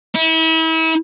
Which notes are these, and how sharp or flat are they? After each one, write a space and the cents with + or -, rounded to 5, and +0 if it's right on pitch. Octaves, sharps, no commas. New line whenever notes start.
E4 -35